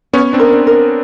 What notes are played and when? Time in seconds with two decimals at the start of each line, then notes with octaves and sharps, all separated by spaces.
0.13 B3 C#4 C#5
0.33 C4 D4
0.39 A#4
0.53 C4 D4
0.67 A#4